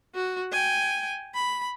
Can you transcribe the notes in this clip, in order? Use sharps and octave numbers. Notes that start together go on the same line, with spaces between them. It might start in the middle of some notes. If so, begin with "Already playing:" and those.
F#4
G5 G#5
B5